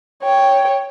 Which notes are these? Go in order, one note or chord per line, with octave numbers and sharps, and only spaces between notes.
C#5 G5